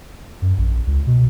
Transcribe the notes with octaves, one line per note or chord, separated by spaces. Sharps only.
F#2
A#1
C#2
B2